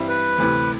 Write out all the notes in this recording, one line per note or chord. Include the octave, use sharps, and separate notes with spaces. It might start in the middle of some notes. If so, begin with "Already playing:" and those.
Already playing: G2 E3 G3 C4 E4
B4
D2 C3 E3